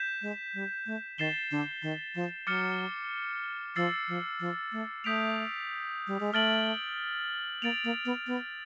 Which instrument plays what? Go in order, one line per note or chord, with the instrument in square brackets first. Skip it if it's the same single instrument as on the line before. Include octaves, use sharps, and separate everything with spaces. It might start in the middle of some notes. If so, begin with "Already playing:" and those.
Already playing: [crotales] G6 B6 E7
[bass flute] G#3
G3
A3
[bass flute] D#3 [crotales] A6 C7 E7 G7
[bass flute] D3
D#3
F3
[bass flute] F#3 [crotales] D6 F6 A6 C#7
[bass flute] F3 [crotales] E6 A6 C7
[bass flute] F3
F3
A3
[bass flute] A3 [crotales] D#6 G6 B6 D7 F7
[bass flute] G3
G#3
[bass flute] A3 [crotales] F6 A6 D7 F#7
[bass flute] A#3 [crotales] A6 D7 F7
[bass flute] A#3
B3
B3